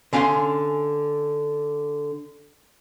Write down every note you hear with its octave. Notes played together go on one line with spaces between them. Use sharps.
D3 C#4 F5 G#5 C6